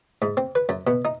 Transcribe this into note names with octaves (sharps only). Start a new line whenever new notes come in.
G#2
C4
B4
F#2
B2
D#4